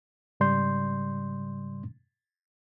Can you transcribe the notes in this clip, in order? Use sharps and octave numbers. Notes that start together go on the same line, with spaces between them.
G#2 C#3 G3 D5 C6 G6